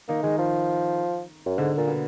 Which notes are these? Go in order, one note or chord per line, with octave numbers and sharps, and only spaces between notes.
D#3 A#3 D#4
D#3 G#3 D#4
F3
F#2
G#2 D3 D4
A#2 A#3
B2 B3